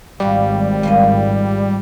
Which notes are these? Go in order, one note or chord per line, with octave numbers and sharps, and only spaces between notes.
G#1 G#2 F3 G3 F#4
A#2 F3 D#5